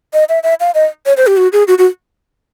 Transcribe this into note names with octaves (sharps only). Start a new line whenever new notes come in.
D#5
E5
E5
F5
D#5
C#5
C5
G4
F#4
G#4
F#4
F#4